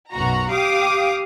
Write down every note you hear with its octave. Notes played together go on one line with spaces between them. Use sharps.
B1 F#2 F#4 A#5
G4 F5 D6 D#6